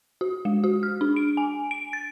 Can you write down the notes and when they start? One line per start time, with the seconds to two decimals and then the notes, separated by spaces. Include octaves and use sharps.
0.21 F#4
0.45 G#3
0.64 F#4
0.83 F6
1.01 D4
1.16 D7
1.37 G#5
1.71 D7
1.93 A6